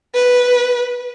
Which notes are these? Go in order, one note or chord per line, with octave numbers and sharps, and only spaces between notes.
B4